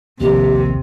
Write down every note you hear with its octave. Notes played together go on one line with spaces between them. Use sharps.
A#1 D#2 C3 G4